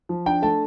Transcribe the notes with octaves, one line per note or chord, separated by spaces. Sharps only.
F3
D4 G5
A3 A5